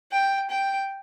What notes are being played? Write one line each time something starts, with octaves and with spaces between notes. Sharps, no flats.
G5
G5